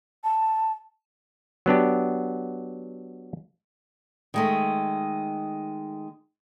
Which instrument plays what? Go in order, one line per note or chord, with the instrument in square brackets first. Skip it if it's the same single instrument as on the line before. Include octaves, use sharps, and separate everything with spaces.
[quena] A5
[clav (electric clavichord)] F#3 B3 D4 G4
[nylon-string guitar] D#3 G#3 A3